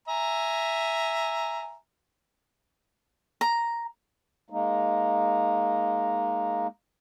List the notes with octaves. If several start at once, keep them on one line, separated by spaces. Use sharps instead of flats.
E5 G#5 A#5
A#5
G#3 A#3 D#4